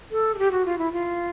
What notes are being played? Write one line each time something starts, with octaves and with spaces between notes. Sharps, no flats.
A4
G#4
G4
F#4
F4
E4
F4